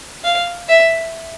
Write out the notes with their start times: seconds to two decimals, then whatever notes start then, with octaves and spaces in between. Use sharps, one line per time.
0.24 F5
0.68 E5